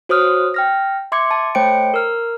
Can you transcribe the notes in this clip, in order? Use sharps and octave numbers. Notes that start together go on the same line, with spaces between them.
F#4 C5 C#5 D#6 F6 F#6
G5 F6 A#6
E5 C6 D6 G#6 C#7
A5
A3 C5 C#5 G5 C#7 D7
A#4 F6